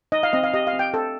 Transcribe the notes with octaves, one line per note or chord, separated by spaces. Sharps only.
D#4 D#5
F5
C4 D#5
F5
G4 D#5
F5
C4
G5
C4 A4